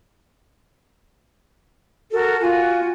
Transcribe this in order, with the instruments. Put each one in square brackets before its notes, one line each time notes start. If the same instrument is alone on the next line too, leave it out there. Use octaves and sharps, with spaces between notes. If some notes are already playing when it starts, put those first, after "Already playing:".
[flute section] F#4 A4 A#4
[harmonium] F4 [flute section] F#4 G#5